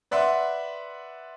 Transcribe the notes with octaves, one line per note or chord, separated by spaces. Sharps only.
B4 D5 E5 F#5 C6